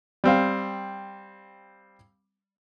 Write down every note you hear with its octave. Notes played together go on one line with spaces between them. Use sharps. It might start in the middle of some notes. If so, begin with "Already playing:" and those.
G3 C4 F5